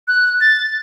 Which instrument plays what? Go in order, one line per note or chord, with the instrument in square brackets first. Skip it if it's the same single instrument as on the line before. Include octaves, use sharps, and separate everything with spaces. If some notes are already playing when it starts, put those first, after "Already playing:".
[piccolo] F#6
A6